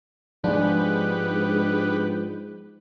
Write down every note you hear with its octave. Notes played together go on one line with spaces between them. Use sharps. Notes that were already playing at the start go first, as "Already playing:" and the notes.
G#2 F3 G#3 B3 D4 G4 B4